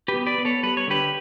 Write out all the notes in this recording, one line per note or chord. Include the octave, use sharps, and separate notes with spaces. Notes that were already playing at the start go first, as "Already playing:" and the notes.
G4 B4
B3
B4 D5
B3
A4 C#5
G3 B4
C#5
D3 G4 B4